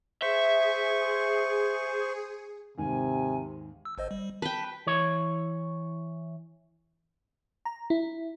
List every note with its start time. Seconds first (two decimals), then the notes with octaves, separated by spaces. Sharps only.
0.22 G#4 C5 E5 C#6
2.78 D#2 G#2 C3 D#3 G#5
3.85 E6
3.98 G#1 C5 D#5
4.11 G3
4.42 B4 G5 A5 B6
4.87 E3 C#5
7.65 A#5
7.90 E4